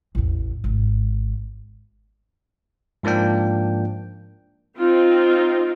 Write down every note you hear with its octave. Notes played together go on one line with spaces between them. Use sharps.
A1 E2
G#1
G#2 F3 A#3 D4 G5
C4 D#4 F4